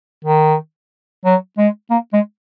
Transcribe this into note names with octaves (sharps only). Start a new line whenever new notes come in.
D#3
F#3
G#3
A#3
G#3